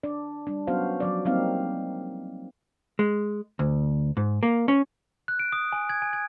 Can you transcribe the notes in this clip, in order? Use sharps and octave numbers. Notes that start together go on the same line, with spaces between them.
D4 D5
G3 D4
F#3 B3 C#4 F#4 C5 F5
F3 F#3 D5
F#3 G3 A#3 C4 D#4 F5
G#3
D2
G#2
A#3
C#4
F#6
D7
D#6
G#5
G#6
G#5
G#6